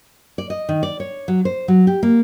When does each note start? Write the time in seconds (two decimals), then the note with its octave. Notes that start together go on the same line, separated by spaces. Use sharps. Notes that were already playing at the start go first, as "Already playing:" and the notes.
0.38 D5
0.50 D#5
0.69 D#3
0.83 D5
1.00 C#5
1.28 F#3
1.45 C5
1.68 F#3
1.87 G4
2.03 A#3